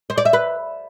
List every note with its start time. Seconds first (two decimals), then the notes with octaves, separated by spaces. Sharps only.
0.10 C5
0.18 D5
0.25 E5
0.33 B4